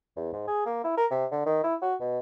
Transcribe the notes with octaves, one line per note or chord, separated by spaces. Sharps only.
E2
G#2
G#4
A#3
E4
A#4
C3
D3
D#3
E4
F#4
B2